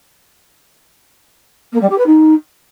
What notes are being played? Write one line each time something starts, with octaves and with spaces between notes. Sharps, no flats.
A#3
G3
G4
B4
D#4